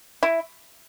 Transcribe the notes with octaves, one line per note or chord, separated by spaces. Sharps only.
E4